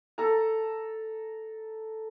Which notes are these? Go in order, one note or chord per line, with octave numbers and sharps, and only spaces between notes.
A4 A#5